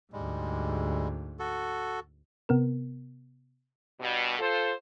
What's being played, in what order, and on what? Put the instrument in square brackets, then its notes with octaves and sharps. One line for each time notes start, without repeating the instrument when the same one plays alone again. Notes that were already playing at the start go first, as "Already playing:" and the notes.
[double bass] D2 G#2 [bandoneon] G3 G#3
[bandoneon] F#4 A4
[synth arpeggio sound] C3 B3 A#4
[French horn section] G2 B2
F4 A4 C5